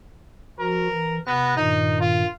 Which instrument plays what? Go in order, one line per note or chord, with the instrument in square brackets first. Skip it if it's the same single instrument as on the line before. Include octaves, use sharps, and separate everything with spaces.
[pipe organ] F3 F#4 [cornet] A#4
[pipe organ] E3
[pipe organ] C3 F#6 A#6 [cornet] B3
[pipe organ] G2 A#2 D#3 [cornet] D#4
[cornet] F4